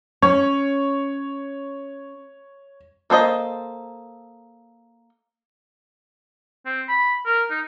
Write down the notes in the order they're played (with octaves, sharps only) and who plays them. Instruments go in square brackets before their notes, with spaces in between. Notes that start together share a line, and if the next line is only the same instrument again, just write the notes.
[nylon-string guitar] C#4 [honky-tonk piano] C#5
[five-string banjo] A#3 A4 C5 D#5
[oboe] C4
B5
A#4
D#4